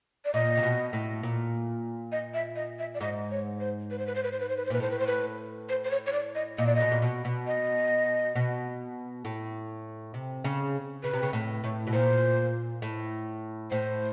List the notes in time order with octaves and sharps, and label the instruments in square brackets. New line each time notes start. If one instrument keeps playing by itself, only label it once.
[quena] D5
[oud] A#2 [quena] D#5
[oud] C3
B2
A2
A#2
[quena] D#5
E5
D#5
E5
D5
[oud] G#2 [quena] D#5
[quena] C#5
C5
B4
C5
B4
C5
B4
C5
B4
C5
B4
C5
[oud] A#2 [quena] B4
[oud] A2 [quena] C5
[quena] B4
C5
B4
C5
C5
C#5
C#5
D5
D#5
[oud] A#2 [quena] D#5
[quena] D5
D#5
[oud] B2
A#2
B2
B2
[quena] D#5
[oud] B2
A2
C3
C#3
[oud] C#3 [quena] B4
[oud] C3
C#3
A2
A2
B2
[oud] A#2 [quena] C5
[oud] A2
[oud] A2 [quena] C5